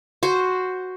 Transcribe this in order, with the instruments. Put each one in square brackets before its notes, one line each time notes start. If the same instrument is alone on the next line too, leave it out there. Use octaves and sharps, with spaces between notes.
[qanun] F#4 C5